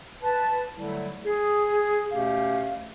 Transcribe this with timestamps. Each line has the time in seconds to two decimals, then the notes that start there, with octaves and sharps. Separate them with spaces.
0.21 B4 A5
0.75 D3 F#3 G3 A3 E4
1.24 G#4
2.10 D2 B2 A3 C#4 G4 F5